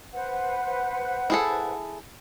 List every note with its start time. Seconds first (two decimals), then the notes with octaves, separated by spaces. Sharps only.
0.13 B4 C5 F#5
1.30 E4 G#4 A4